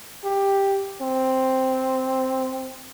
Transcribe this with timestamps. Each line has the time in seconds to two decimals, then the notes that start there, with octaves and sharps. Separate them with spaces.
0.24 G4
1.01 C4